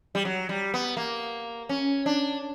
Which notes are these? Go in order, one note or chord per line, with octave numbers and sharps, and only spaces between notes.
G3
F#3
G3
B3
A#3
C#4
D4